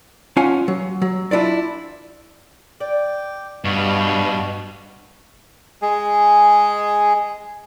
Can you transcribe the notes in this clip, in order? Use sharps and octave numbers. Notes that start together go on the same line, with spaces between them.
C#4 F4 F#5 G#5 A5
F#3
F#3
D4 E4 F4 D5
D5 G5 D6
G2 B2 G3 F#4 F5
G#3 G#4